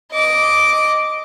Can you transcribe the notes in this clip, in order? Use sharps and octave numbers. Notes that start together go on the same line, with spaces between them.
D#5 D6